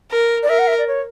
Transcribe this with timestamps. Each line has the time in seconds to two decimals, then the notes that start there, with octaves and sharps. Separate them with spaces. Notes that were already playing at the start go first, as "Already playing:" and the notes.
0.11 A#4
0.42 D5
0.49 A#4 E5
0.58 F#5
0.67 E5
0.77 D5
0.87 C#5